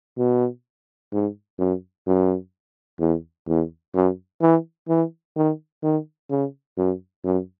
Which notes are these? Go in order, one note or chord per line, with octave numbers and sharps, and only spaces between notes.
B2
G#2
F#2
F#2
E2
E2
F#2
E3
E3
D#3
D#3
C#3
F#2
F#2